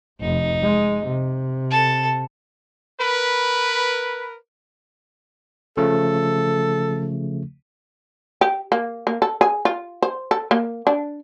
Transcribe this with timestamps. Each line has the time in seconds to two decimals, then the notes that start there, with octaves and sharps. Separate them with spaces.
0.21 F1 D#4
0.63 G#3
1.06 C3
1.71 A4 A5
3.00 A#4 B4
5.77 C#3 F3 A3 A4
8.41 G4
8.72 A#3
9.07 A#3
9.22 A4
9.41 G#4
9.65 F4
10.02 C5
10.31 A4
10.51 A#3
10.87 D4